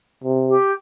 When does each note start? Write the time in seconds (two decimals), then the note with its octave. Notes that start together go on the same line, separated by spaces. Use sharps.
0.24 C3
0.48 G4